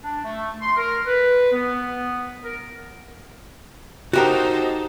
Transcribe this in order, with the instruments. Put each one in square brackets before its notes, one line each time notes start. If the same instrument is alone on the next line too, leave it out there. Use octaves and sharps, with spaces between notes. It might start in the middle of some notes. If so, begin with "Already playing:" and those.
[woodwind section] D4
A3
C6
A#4
B4
B3
A#4
[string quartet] D#4 A4 C5 [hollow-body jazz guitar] F#4 G4 A#4